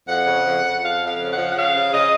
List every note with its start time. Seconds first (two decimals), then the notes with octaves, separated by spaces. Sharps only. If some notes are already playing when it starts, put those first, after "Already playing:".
0.08 F2 F#5
0.27 C#3
0.45 F2
0.64 F2
0.82 F3 F5
1.01 F2 F5
1.19 C#3
1.32 F#5
1.37 F3
1.50 F#5
1.55 C#3 F5
1.74 C#3
1.93 C#3 D#5